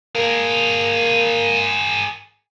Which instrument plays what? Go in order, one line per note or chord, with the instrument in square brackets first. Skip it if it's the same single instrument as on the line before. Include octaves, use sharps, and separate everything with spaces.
[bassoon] A#3 [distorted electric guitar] G#4 A#4